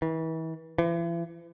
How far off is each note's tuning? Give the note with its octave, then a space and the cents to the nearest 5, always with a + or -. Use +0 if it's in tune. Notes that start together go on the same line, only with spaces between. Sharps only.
E3 -35
E3 +40